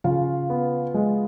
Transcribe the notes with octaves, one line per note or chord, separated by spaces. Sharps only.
C#3 F4 F5
B3
G#3